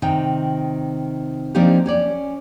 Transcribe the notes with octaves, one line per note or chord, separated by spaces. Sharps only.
C3 D#3 G5
F3 A#3 C4 D4 D#4 G4
C#4 C#5 D5